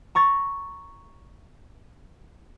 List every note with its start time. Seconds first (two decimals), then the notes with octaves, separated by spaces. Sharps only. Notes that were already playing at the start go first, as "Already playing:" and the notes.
0.15 A#5 C#6 A6